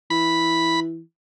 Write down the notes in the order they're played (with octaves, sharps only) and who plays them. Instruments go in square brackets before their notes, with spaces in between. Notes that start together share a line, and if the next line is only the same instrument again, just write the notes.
[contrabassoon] E3 [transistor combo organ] B5